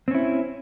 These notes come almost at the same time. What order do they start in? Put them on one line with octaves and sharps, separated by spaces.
C4 C#4 E4